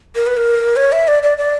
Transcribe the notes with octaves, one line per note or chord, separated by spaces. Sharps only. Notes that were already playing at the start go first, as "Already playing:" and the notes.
A#4
B4
A#4
C#5
E5
D5
D5
D5